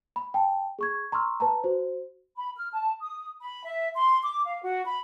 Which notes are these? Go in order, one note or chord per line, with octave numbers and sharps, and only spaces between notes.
B5
G5 A5
G#4 C#6 G#6
A#5 C6 C#6 E6 F6
B4 A5 A#5
F#4 C5
B5
F6
A5
D#6
B5
E5
C6
D6
F5
F#4
B5